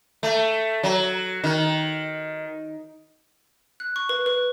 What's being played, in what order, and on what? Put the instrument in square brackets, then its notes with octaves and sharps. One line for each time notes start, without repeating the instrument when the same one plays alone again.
[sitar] A3
F#3
D#3
[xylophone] F#6
C#6
B4
B4